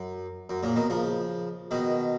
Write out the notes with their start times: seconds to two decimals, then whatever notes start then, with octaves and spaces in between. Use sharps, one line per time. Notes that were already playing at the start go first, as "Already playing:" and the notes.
Already playing: F#2
0.50 F#2
0.63 A#2 C#3
0.76 B2 D#3
0.90 C#3 F3
1.71 B2 D#3